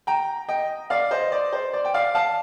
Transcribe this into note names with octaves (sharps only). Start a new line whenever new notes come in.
G5 A#5
D#5 G5
D5 F5
C5 D#5
D5
C5
D5
G5
D5 F5
F5 A5